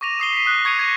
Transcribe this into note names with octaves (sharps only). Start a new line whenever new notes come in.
C#6 D6 A#6 D#7 F7
D#6 C7 G7
B6 D#7
D#6 F#6
C#6 G#6 C7 C#7 D#7 F7
G#6 A#6